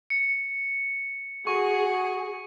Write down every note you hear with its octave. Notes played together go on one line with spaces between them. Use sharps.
C#7
F#4 G#4 C#6